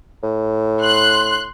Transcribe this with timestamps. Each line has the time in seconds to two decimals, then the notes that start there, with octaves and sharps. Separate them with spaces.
0.23 A2
0.82 C6 F#6